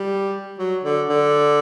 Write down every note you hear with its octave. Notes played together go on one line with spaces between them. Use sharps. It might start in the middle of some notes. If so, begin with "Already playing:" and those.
Already playing: G3
F#3
D3
D3